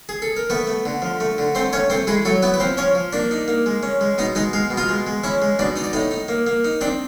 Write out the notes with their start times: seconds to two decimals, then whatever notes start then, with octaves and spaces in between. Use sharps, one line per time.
0.09 G#4
0.22 A4
0.37 A#4
0.50 A3 B3 B4
0.67 A3
0.86 D3
1.02 F3
1.20 A3
1.38 D3
1.55 A3 C4 C5
1.73 A3 C#4 C#5
1.90 A3 C4 C5
2.07 G#3 E4 G#4
2.25 F#3 A3 A4
2.42 B3 E4 B4
2.54 B4
2.60 F3 C4 C5
2.77 F3 C#4 C#5
2.95 F3
3.13 A#3 D4 D5
3.31 D#4
3.48 A#3
3.66 G#3
3.83 C#4
4.01 G#3
4.18 B2 D#4 D#5
4.35 G#3 D#4 D#5
4.53 G#3 F5
4.71 B2
4.77 F4 F5
4.89 G#3
5.07 G#3
5.24 C#4 E4 E5
5.42 G#3
5.59 B2 D4 D5
5.76 D#4 D#5
5.84 D5
5.93 A2 D#4 D#5
6.11 D#4
6.28 A#3
6.47 A#3
6.65 D#4
6.81 C4 D4 D5